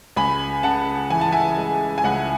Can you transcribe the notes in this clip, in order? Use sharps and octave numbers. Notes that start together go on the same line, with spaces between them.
C#2 G#5 B5
C#3 F#5 A5
E3 G#5
A5
E5 G#5
G#3
G#5
C#2 F#5